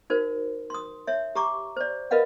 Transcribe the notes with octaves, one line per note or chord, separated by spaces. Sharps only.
D#4 F#4 A#4 C5
C6 D#6
C#5 E5
G4 A#5 C#6 D6
C5 D5
F4 A#4 B4 D#5 F5 F#5